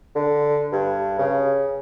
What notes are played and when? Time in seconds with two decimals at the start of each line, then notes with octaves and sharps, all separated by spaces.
0.16 D3
0.72 G2
1.19 C#3